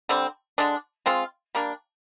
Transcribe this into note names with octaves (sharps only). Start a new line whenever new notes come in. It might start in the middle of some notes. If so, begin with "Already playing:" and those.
D3 G3 C4
D3 G#3 D4
G#3 C4 F4
G3 A#3 D4